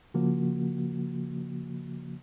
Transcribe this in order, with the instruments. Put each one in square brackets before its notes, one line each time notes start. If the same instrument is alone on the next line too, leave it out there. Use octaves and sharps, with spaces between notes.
[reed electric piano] C#3 F3 A#3 F#4